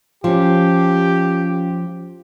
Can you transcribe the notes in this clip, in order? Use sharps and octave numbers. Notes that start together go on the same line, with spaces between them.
F3 C#4 F4 G4